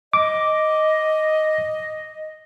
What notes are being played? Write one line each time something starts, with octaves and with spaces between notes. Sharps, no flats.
D#5 D6